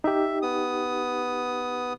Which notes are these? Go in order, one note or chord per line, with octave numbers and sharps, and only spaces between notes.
D#4 G4 E5
B3 D#6